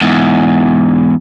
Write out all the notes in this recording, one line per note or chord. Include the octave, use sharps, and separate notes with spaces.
E2 G#2